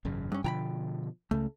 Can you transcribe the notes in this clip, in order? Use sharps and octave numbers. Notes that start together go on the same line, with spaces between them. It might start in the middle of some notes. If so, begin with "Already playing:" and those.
G#1 F#2 C#3
G2 C#4
B2 D3 F3 G5 A#5 B5
C#2 C#3 A3